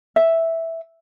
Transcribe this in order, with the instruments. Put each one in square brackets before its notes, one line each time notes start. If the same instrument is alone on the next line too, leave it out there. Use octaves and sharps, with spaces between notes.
[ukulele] E5